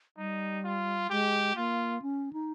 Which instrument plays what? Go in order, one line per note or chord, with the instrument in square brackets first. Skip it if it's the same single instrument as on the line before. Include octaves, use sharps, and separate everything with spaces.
[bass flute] G3 [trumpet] D#4
[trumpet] F4
[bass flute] G#3 [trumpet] G4
[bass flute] A#3 [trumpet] F4
[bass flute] C#4
D#4